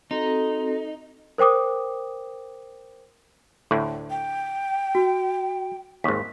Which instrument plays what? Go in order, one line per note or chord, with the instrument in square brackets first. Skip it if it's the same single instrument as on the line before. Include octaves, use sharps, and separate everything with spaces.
[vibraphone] C4 F#4 A4 [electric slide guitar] D#4
[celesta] A#4 C5 G5 D6 D#6
[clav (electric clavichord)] D2 A2
[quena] G5
[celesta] F#4
[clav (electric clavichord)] G#1 D#2 [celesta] B6